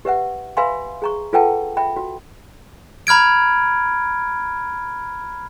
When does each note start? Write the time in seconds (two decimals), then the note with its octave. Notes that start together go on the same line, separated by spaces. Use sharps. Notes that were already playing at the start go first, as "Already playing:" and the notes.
0.05 G4 B4 E5 F#5
0.57 B4 E5 F5 G#5 B5 C6
1.02 G#4 A#5 C#6
1.33 F4 A4 B4 F#5 G5 A5
1.77 E5 G5 B5
1.97 F#4
3.07 A#5 B5 F6 G#6 D7